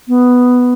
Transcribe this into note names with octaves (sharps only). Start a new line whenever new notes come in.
B3